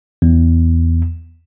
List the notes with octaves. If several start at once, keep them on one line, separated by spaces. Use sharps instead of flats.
E2